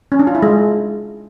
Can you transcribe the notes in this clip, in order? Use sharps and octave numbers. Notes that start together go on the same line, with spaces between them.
C#4
D4
F4
E4
G#3